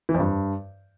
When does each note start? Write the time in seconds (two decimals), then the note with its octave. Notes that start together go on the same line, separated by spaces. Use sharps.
0.09 E3
0.14 F2
0.20 G2